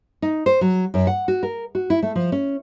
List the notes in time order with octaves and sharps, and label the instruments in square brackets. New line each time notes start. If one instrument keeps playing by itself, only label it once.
[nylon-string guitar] D#4
C5
F#3
F#2
F#5
F#4
A#4
F#4
E4
A3
F3
C#4